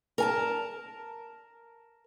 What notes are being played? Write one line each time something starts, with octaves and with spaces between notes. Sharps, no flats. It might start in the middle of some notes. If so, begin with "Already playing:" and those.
A#4 G#5 A5